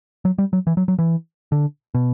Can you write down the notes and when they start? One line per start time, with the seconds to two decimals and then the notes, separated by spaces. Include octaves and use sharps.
0.25 F#3
0.38 G3
0.53 F#3
0.67 E3
0.77 F#3
0.88 F#3
0.99 E3
1.52 D3
1.95 B2